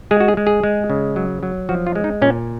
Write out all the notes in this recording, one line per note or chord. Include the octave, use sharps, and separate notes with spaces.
G#3 G#4
F#4
G#4
G#3
G#4
G#3
C#3
F#3
F#3
F3 F#4
F4
G#3
D#4
A#2 C#4